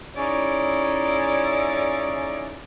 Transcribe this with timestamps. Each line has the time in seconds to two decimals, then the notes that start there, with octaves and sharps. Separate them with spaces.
0.15 C#4 D#4 E4 G#4 C#5 D5